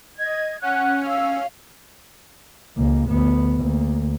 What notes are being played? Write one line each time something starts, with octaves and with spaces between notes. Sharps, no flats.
D#5 G#6
C#4 F#5 F#6
F5 E6
C#2 A#3
D2 B3
D2 A#3